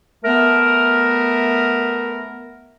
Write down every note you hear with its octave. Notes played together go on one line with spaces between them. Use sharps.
A3 B3 A#4